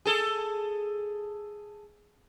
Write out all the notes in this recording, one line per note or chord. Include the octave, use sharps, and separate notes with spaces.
G#4 A4